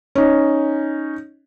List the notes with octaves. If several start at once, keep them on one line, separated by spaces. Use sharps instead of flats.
C#4 D#4